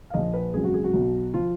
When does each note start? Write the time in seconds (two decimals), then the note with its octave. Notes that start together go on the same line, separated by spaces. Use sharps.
0.10 F5
0.14 A#1 A#2 F3 D#5
0.34 B4
0.54 G#1 F#2 C#3 F#3 G#4
0.64 F#4
0.74 G#4
0.84 F#4
0.93 B1 B2 F#3
1.34 F3 F4